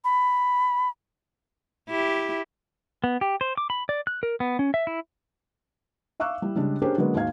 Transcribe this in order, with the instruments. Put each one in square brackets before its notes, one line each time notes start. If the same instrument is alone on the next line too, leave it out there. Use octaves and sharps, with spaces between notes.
[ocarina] B5
[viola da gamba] E4 G4
[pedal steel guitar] B3
G4
C5
D6
B5
D5
F#6
A#4
B3
C#4
E5
E4
[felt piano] E5 F5 C#6 D6 E6 F#6
G3 E4
C#3 G3 G#3 D4
C#4 D4 G4 G#4 A#4 C5
D3 F#3 G#3 A#3 B3
D#2 G#2 D#4 F#4 F5 G#6